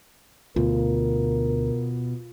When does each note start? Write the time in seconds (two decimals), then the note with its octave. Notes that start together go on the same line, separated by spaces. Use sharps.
0.56 D2 B2 F4 A#4